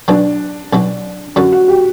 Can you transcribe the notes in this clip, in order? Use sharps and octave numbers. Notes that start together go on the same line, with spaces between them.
B1 B2 F#3 D4
B1 B2 F#3
F#2 D3 F#3 F#4
F#4
G4